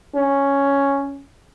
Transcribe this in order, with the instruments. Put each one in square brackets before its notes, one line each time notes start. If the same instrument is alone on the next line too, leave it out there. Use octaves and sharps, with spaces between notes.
[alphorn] C#4